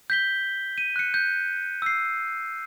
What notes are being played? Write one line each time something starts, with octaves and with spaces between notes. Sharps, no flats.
G6 B6 G7
D#7
F#6 C#7
G6
E6 C7